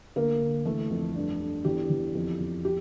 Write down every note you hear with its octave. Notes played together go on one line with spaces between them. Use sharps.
D2 A#3 A#4
D2
E3 A3 A4
F2
G2
G2
E2 G4
E2
F2
F2
G4